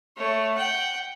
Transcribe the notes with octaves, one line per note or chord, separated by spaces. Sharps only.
A3 C#5
F#5 G5